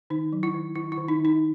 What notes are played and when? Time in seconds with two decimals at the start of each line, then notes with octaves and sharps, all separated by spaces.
0.10 D#3 D#4
0.32 F#3
0.43 E4
0.54 D#3
0.75 D#3 E4
0.92 E4
0.98 D#3
1.08 D#4
1.19 D#3
1.25 D#4